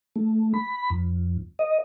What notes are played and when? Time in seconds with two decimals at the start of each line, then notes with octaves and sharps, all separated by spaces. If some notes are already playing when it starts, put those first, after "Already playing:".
0.16 A3
0.54 B5
0.90 F2
1.59 D#5